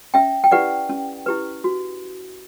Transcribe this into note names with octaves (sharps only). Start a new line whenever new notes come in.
C#4 E5 G5
G5
E4 G4 B4 D5 F#5
C#4
E4 G4 B4
F#4